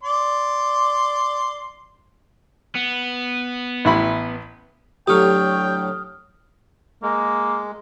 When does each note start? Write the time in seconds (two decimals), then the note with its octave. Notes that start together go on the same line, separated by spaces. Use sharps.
0.03 D5 C6
2.76 B3
3.85 A1 E4 B5
5.07 A2 D3 F#3 G4 G5 C#6 D#6 F6
7.03 G#3 A#3